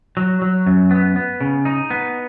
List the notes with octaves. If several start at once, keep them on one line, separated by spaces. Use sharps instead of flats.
F#3
F#3
F#2
B3
B3
C#3
D#4
B3